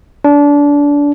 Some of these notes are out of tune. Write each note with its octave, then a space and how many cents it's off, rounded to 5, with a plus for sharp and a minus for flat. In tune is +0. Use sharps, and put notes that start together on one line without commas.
D4 -25